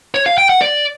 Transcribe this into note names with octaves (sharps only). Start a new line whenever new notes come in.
C#5
F5
G5
F#5
D5